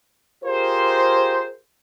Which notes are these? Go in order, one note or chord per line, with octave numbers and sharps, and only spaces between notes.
F4 G4 G#4 A#4 C5